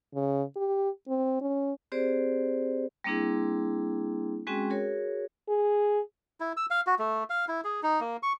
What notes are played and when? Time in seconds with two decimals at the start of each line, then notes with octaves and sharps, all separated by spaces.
0.15 C#3
0.56 G4
1.08 C4
1.41 C#4
1.92 C4 G4 G#4 C5 D5
3.04 G3 A#3 C4 D4 E4 G#4
4.47 G#3 C4 C#4 F#4 G#4 G5
4.70 F#4 G#4 A#4 C#5
5.48 G#4
6.40 E4
6.57 E6
6.70 F5
6.87 F#4
6.99 A3
7.30 F5
7.48 E4
7.64 G#4
7.83 D#4
8.00 A#3
8.23 C#6